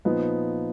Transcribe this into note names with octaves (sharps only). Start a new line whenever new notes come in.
A#2 F3 B3 D#4